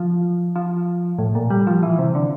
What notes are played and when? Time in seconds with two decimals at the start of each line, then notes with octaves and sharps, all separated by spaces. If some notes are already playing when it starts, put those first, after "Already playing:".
Already playing: F3
0.56 F3
1.19 A2
1.35 A#2
1.50 G3
1.67 F3
1.83 E3
1.99 C3
2.15 D3